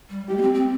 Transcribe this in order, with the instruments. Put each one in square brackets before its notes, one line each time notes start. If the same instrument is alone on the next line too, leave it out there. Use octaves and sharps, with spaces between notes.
[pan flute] G3
[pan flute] G#3 [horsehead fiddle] G4
[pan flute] A#3
C4
C4